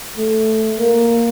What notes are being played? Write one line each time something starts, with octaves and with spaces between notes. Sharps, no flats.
A3
A#3